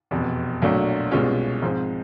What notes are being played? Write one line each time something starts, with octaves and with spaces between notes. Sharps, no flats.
F1 E2 B2
B1 A#2 F#3 A3 D4
C2 B2 G#3 C#4 F4
G#2 F3 G#3 C4